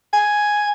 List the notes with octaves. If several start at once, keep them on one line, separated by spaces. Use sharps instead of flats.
G#5